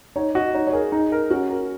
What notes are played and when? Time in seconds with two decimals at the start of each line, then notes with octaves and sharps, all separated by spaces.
0.16 D#4 C#5
0.35 F#4 D#5
0.54 D#4 C#5
0.67 C#5
0.73 G#4 A#4
0.92 D#4
1.12 A#4
1.30 C#4 F#4
1.50 A#4